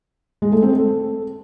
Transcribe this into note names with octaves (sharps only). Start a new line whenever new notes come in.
G#3
A3
C4
A4